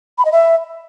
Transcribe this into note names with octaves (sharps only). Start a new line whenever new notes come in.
B5
D#5
E5